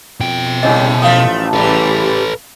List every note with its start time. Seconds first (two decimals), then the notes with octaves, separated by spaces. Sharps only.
0.20 F2 B2 G5
0.63 C2 A2 C#3 C#4 C#5 D#5
1.02 A1 F3 A3 D5 F5 D#6
1.54 C#3 E3 G3 A4 B4